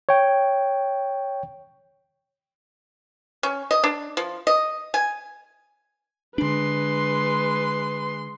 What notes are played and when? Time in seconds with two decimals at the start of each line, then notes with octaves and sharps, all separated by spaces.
0.09 C#5 G5
3.43 C#4
3.71 D#5
3.84 D4
4.17 F3
4.47 D#5
4.94 G#5
6.38 D3 G#3 D4 B4 C6